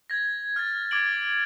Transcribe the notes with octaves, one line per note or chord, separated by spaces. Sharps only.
G#6 A#6
F6 G#6 A6
D6 G#6 D7 F#7